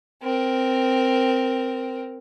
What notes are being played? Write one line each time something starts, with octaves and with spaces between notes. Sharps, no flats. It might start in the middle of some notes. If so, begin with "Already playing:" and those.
C4 A#4